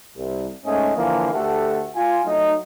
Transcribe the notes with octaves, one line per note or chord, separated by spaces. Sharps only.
C2
G#2 A3 C#4 D#5 G#5
D3 E3 F3 A#3
D2 A3 G4 A4 F#5
F4 G#5
F#3 A3 D#4